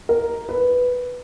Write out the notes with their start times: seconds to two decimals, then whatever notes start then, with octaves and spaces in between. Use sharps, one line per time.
0.09 A#4
0.49 B4